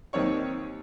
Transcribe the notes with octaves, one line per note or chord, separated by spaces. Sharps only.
D#2 D#3 C4 C#5 C#6